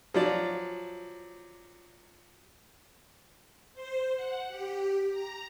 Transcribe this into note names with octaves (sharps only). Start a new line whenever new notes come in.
F3 F#3 D5
C5
F#5
G4
A#5